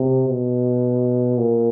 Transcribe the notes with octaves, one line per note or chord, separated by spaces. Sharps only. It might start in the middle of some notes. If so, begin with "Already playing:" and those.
Already playing: C3
B2
A#2